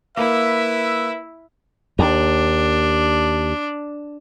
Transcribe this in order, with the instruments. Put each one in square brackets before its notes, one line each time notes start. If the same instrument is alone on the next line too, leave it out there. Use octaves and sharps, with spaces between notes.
[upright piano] A#3 [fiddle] E4 [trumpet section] B4 E5
[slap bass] D#2 [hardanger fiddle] D4